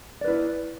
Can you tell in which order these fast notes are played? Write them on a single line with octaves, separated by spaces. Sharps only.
D5 B4 E4